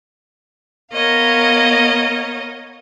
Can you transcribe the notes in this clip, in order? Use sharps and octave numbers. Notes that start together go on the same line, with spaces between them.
B3 A#4 C#5 D#5 F5